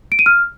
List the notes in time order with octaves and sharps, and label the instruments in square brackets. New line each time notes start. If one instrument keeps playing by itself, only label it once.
[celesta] D7
D#7
F6